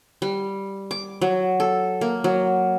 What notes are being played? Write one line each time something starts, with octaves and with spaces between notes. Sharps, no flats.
G3
D6
F#3
A4
A#3
F#3